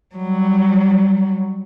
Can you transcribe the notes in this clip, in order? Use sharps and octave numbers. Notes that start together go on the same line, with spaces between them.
F#3 G3